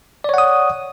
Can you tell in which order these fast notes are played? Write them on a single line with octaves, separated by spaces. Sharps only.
D5 C#5 F#5 D#6